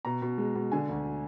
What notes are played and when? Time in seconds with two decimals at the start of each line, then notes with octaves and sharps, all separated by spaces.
0.05 B2 A#5
0.22 B2
0.38 G#3
0.55 B2
0.72 D3 G#5
0.89 D2